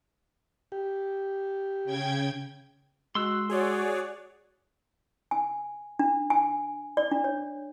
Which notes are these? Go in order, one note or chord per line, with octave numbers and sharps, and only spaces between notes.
G4
C#3 G5 G#6
G#3 F#4 C6 E6 F#6
F#4 G#4 C#5 D5
G#5
D4
G#5
D5
D4
C#5